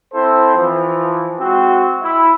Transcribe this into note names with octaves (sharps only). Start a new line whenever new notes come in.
C4 E4 A4 C5
E3 F3
G#3 C4 F#4
E4